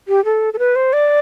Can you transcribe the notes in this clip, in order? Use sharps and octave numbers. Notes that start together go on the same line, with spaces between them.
G4
A4
A4
B4
C5
D5